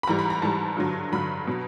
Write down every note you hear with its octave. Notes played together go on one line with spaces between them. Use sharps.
B5
G#2 E3 G3 A#5
B5
A#5
G#2 E3 G3 A5
G2 D3 F#3
G2 D3 F#3 B5
B2 F#3